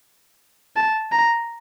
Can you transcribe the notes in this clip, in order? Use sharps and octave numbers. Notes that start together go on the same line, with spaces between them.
A5
A#5